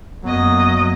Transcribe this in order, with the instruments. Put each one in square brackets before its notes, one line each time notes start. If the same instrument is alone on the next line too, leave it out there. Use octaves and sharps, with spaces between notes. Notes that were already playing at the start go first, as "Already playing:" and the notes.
[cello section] F#2 [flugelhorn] F#3 [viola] A#3 D#5 [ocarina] B3